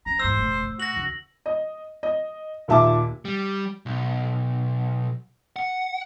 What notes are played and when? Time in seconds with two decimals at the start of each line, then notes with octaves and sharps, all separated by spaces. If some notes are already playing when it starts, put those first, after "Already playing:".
0.06 C#4 A#5
0.20 E2 G#2 C5 E6
0.38 F1 A#2
0.63 A2
0.80 F#4 A#6 F#7
0.96 D#2 C#3
1.46 D#5
2.03 D#5
2.68 D#2 A#2 E5 A5 D6
3.25 G3
3.86 B1
5.56 F#5